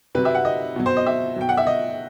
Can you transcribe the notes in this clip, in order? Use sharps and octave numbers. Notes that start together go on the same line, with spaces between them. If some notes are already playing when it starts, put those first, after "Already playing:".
C3 F#3 B4
E5
F#5
D#5
B2 F#3
C5
D#5
E5
B2 F#3 G5
F#5
E5
D#5